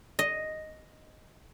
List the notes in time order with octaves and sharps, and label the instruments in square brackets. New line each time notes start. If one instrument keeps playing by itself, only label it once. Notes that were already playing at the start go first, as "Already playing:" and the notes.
[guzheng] D#5